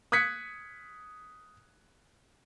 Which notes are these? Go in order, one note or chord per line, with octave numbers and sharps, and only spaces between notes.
D#6 F#6 G#6 B6 C#7